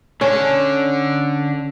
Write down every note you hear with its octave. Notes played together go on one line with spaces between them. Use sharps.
D3 C#4 A4